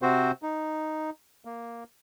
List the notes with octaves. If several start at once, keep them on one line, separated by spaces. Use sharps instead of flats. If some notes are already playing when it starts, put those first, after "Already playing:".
C3 C4 F#4 C5
D#4
A#3